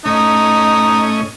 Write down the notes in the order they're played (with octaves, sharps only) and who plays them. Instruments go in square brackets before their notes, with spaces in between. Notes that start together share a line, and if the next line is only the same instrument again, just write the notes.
[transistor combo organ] A2 C#4 D#5 [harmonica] D#4